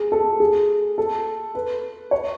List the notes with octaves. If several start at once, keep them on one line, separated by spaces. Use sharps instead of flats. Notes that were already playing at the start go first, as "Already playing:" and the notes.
Already playing: G#4
A4
G#4
A4
B4
C#5